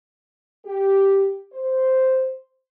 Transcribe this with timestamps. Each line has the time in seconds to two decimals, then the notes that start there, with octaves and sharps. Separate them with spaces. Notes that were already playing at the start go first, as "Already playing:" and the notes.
0.65 G4
1.53 C5